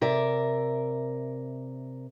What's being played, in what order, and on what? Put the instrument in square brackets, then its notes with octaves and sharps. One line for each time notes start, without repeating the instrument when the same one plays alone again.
[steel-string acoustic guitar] C3 A#4 D5 E5